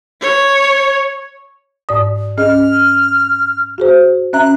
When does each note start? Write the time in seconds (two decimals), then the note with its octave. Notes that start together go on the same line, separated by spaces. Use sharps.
0.21 C#5
1.89 G#2 D5 D#6
2.38 C#4 G#4 D#5 F6
3.78 F#4 G#4 C5
4.33 C#4 E5 A#5 F#6